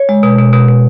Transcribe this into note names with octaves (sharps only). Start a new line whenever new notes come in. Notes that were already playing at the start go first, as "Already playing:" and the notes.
Already playing: C#5
G#3
B2
B2
B2
B2